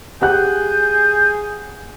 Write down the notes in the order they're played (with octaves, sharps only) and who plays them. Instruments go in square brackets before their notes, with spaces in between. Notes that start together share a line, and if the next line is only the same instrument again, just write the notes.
[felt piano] G4 F#5 F#6 [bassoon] G#4 [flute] G6